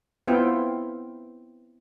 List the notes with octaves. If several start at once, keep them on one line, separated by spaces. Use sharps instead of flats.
B3 C4 E4 F4 G5